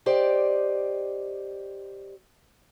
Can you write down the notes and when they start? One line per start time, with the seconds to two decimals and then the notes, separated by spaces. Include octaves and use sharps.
0.06 G4 C5 D5 D#5